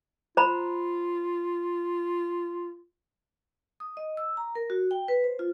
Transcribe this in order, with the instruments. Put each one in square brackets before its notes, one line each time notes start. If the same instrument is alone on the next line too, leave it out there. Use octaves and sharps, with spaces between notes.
[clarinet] F4 [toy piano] C5 A#5 B5
[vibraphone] D#6
D#5
E6
A#5
A#4
F#4
G5
B4
C5
F4